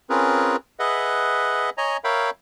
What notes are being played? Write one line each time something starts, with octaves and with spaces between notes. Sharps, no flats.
C4 C#4 F4 G#4 A#4 B4
G#4 B4 D#5 E5 F#5
C#5 D#5 G#5 A#5
A#4 C#5 E5 F5 G5 B5